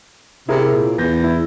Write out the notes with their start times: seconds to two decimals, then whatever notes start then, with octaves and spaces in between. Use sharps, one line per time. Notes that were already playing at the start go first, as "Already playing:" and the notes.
0.49 C3 E4 G#4 A#4
0.72 A#2
0.98 E2 G6 A#6
1.24 E4